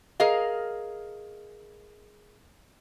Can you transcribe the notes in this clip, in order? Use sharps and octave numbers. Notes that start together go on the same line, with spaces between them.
G#4 A#4 D#5 F5